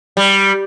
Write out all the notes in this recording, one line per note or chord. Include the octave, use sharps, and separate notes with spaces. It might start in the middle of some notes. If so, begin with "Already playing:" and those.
G3